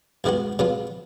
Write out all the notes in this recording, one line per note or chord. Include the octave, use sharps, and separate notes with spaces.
F#2 D#3 G#3 B3 F#4
C#3 F#3 B3 F4